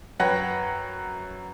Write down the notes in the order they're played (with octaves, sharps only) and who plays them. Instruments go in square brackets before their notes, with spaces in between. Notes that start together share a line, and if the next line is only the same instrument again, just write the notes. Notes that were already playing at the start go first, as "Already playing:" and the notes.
[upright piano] F#2 B4 C#5 F#5 G5 A#6